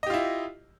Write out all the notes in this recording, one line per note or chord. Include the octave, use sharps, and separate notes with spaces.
E4 F4 G4 D#5